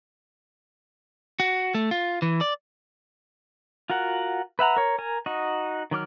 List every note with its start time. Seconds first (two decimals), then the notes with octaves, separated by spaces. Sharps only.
1.40 F#4
1.74 A3
1.91 F4
2.22 E3
2.41 D5
3.90 F4 F#4 A#4 F#5
4.59 B4 E5 F#5 A#5
4.77 A#4 C#5
4.99 A#4 G#5
5.26 D#4 F#4 D#5
5.91 D#3 F#3 D6 F6